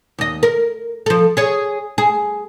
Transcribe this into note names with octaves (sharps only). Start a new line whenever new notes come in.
D#2 D#5
A#4
F3 A4
G#4 C#5
G#4